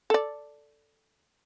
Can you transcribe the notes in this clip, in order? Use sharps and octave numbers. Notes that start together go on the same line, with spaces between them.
A4 D5